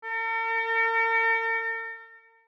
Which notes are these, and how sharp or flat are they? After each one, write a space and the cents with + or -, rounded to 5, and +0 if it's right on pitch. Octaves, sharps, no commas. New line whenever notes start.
A#4 -45